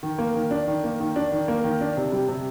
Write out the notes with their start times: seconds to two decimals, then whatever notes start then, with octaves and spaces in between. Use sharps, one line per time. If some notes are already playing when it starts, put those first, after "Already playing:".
0.03 D#3
0.19 A#3
0.35 D#3
0.51 D4
0.68 D#3
0.84 A#3
1.00 D#3
1.16 D4
1.32 D#3
1.48 A#3
1.64 D#3
1.81 D4
1.97 C3
2.12 G3
2.29 C3